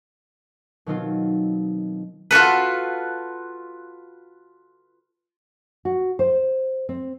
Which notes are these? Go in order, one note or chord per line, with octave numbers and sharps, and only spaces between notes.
B2 D#3 F#3 C4 D#4 F4
F4 F#4 A4 B4
F#4
C5
C4